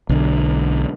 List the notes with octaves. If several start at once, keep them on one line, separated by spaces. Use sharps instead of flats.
B1 D3